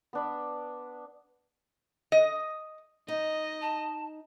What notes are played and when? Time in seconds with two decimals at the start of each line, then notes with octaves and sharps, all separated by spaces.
0.13 B3 D4 B5
2.12 D#5
3.08 D#4 D#5
3.61 A5